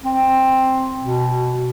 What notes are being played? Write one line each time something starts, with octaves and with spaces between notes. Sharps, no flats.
C4
B2